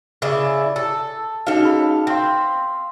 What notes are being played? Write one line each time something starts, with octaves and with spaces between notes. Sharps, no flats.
C#3 E4 D5
A4
C#4 D#4 F#4 A4 F5
G#4 B5
C4 F5 C6